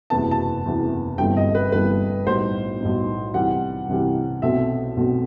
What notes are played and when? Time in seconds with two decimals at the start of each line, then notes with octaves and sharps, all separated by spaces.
0.10 F#1 E2 C3 E3 B3 A5
0.31 A5
0.65 F#1 E2 C3 E3 B3
1.18 G1 G2 E3 A3 C4 G5
1.37 D#5
1.55 B4
1.72 G1 G2 E3 A3 C4 B4
2.26 B1 A2 G3 D#4 C5
2.80 B1 A2 G3 D#4
3.34 C2 C3 E3 G3 F#5
3.88 C2 C3 E3 G3
4.42 B1 B2 A3 C4 E5
4.96 B1 B2 A3 C4